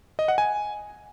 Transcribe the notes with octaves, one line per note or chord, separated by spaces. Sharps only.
D#5
F#5
G#5